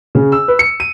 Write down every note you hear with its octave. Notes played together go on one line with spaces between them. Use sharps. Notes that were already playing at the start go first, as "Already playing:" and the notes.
C#3
E6
B4
C#7
D#7